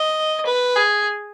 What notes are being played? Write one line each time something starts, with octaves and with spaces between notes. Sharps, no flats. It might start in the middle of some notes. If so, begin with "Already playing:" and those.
Already playing: D#5
B4
G#4